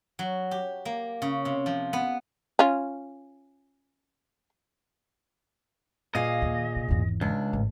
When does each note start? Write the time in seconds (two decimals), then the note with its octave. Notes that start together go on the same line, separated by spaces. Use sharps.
0.19 F#3
0.51 G4
0.85 A#3
1.22 C#3
1.45 C3
1.66 F3
1.93 B3
2.59 C#4 F4
6.15 A#2 G#4 D#5 F5
6.42 D#2
6.76 C3
6.89 G#1 E2
7.21 C#2 D4
7.53 A1 G#2